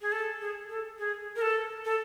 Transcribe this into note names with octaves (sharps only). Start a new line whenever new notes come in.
G#4
A4
G#4
A4
G#4
A#4
A4
A4